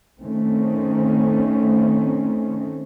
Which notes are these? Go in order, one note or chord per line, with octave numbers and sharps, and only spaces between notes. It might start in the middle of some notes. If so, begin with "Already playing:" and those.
D#3 A3 C4 C#4